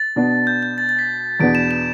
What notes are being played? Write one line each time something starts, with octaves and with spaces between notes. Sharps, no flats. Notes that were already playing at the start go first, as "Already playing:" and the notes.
Already playing: A6
B2 B3 D4
G6
G6
A6
A6
B6
E2 B2 B3 D4 D7
E7
E7